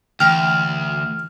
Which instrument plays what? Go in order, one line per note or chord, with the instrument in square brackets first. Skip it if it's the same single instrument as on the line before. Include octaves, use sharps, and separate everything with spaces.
[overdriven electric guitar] D2 [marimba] E3 [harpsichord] G5 [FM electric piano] F6